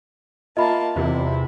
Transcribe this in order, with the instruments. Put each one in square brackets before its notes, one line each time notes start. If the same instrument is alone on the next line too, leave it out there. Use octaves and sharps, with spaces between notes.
[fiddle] A#3 A5 [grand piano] F4 [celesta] D#5 E5 B5
[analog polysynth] E2 C3 [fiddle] E4